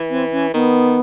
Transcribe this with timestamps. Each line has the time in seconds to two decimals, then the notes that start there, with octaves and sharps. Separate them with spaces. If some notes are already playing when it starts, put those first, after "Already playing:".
Already playing: E3
0.10 C4
0.32 C#4
0.54 D#3 B3